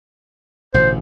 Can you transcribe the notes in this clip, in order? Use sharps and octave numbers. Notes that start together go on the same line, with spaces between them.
A1 B2 D3 C5